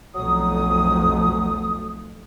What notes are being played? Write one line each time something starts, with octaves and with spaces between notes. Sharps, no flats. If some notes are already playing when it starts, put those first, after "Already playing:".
B1 F2 F#3 A3 D#6